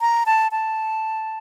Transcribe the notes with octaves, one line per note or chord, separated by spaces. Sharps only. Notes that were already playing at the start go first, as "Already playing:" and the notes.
A#5
A5
A5